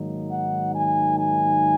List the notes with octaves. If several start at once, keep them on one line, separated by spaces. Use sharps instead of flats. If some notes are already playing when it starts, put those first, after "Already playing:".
Already playing: G#2 D#3 F#3 A#3 D#4
F#5
G#5
G#5